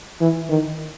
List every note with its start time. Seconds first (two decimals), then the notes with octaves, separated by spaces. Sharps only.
0.21 E3
0.50 D#3